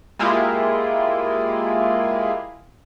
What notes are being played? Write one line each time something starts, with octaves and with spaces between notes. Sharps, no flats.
G#3 A#3 E4 F4 G4 G#4